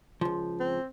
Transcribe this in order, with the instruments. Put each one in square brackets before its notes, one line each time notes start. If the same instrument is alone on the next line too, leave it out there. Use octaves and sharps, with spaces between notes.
[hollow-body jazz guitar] C#2 F3
[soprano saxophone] C4